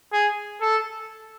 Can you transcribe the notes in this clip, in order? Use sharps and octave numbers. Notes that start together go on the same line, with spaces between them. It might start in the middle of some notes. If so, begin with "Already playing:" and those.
G#4
A4